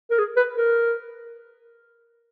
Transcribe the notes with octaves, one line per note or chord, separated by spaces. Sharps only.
A#4
G#4
B4
A#4